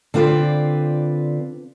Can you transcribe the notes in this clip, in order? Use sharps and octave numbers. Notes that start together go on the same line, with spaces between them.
D3 C4 F4 B4 D5